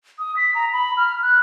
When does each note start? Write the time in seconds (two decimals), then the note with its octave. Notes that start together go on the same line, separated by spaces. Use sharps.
0.19 D#6
0.37 B6
0.55 A#5
0.73 B5
0.97 F6
1.23 F#6